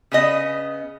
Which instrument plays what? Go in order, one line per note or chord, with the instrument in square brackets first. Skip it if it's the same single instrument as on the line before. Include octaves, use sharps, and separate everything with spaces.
[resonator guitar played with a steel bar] C#3 B3 D#5